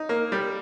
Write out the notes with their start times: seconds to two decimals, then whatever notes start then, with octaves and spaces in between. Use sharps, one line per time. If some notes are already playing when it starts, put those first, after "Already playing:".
Already playing: D#4
0.09 A#3
0.32 G3